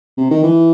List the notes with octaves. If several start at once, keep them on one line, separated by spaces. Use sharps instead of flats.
C3
D#3
E3